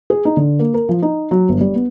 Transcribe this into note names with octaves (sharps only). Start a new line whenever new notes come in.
G#4
D#4
D3
A#3
A#4
F3
D#4
F#3
G1
G3
B3